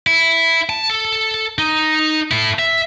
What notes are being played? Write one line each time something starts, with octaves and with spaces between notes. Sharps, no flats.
E4
A5
A4
D#4
E4 A4
E5